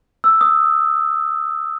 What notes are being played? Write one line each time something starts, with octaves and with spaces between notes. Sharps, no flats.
E6
D#6